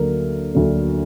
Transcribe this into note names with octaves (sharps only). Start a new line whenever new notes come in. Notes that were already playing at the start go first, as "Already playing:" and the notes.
Already playing: D2 D3 F#3 A#3 A#4
D2 D3 F#3 A#3